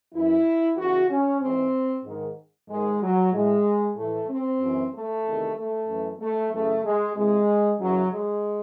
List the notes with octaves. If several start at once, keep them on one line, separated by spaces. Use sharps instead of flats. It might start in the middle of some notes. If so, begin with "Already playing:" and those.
F#2 E3 E4
E2 C#3 E3 F#4
C#4
G#2 E3 C4
G#2 D#3
G#2 D#3 G#3
F#3
A2 E3 G#3
A2 E3 A3
C4
F#2 E3
A3
E2 C3 D#3
A3
F#2 E3
A3
F#2 C#3 E3 A3
G#3
E2 C3 E3 G#3
F#2 C#3 E3 F#3
G#3